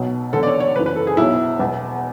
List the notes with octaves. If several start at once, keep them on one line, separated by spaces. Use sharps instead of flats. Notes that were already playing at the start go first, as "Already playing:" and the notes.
Already playing: B1 B2 F#3
E2 D3 F#3 A4
D5
C#5
C#5
F#1 F#2 E3 B4
B4
A4
G#4
B1 B2 F#3 E4
E1 E2 B2 F#3